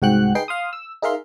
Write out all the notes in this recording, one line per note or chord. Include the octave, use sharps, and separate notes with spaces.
C2 G#2 F#4 F#5 G5 F#6
D#4 G#4 B4 G5 C7
F5 C6 D#6
E6
D#4 G#4 A#4 E5 F5 C6